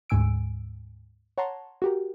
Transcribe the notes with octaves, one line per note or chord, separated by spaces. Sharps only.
D2 G#2 G#5 E6 D7
C#5 F#5 A5 A#5 C6
F#4 G4 A#4